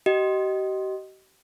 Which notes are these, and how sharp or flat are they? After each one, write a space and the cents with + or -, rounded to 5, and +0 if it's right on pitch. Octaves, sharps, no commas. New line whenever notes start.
G4 -40 D#5 +0